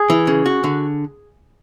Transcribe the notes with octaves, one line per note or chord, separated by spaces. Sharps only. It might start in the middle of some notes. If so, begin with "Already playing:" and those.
Already playing: G#4
E3
C#3
F#4
D3